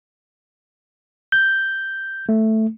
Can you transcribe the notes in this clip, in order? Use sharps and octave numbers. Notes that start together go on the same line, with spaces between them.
G6
A3